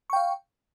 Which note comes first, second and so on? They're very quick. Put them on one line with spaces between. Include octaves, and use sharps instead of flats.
C#6 G5 F5